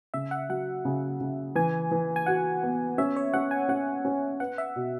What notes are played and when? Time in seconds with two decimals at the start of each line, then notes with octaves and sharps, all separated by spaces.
0.14 C#3 E5
0.31 F#5
0.49 F#3 F#5
0.85 C#3
1.21 C#3
1.55 E3 G#5
1.91 E3
2.16 G#5
2.26 F#4 F#5
2.63 B3
2.98 C#4 E5
3.16 C#5
3.33 C#4 F#5
3.51 G#5
3.69 C#4 F#5
4.05 C#4
4.40 B4 F#5
4.58 E5
4.76 B2